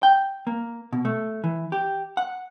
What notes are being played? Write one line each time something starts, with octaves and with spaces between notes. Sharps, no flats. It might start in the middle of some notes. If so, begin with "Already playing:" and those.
G5
A#3
B2
A3
E3
G4
F#5